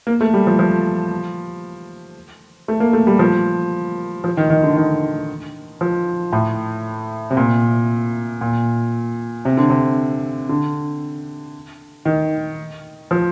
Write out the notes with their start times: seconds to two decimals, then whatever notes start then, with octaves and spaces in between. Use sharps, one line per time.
0.07 A#3
0.21 A3
0.34 G3
0.47 F3
0.59 F3
2.68 A3
2.80 A#3
2.93 A3
3.07 G3
3.19 F3
4.24 F3
4.37 D#3
4.50 D#3
4.63 D3
4.77 D#3
5.81 F3
6.33 A2
7.31 C3
7.37 A#2
8.41 A#2
9.45 C3
9.57 D3
9.70 C3
10.49 D3
12.05 D#3
13.11 F3